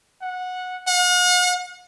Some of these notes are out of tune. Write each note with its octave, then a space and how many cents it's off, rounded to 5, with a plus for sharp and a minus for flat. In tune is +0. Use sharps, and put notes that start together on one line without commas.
F#5 -15
F#5 -45